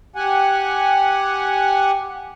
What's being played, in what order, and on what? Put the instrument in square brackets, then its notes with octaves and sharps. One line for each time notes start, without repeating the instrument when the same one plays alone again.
[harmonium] G4 F#5 G#5